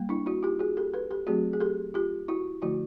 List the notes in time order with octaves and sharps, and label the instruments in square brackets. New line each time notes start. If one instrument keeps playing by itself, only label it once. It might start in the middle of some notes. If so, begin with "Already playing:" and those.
Already playing: [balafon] G3 A#3
D4 E4
E4 F#4
F4 G4
F#4 G#4
G4 A4
A4 B4
G4 A4
F#3 A3 C4 F#4 G#4
G#4
G4 A4
F4 G4
E4 F#4
D3 F3 A3 E4 F#4